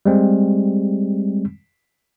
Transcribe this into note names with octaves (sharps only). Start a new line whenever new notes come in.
G3 G#3 C4